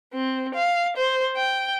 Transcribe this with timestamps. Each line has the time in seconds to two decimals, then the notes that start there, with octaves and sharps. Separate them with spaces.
0.14 C4
0.55 F5
0.97 C5
1.37 G5